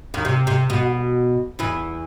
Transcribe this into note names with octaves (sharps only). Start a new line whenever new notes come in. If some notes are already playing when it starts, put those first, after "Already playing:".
D#2 D#3
C3
C3
B2
E2 E3